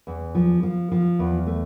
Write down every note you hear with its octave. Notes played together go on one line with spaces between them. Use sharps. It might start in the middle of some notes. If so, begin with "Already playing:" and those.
E2
F3
F3
F3
E2
A3